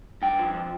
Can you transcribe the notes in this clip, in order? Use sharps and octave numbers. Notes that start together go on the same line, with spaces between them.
G2 G5
F3